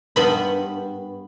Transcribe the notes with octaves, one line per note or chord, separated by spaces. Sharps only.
G2 B3 B5